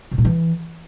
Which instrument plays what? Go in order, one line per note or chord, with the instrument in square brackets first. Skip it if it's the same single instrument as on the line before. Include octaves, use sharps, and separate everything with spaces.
[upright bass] B2
A#2
E3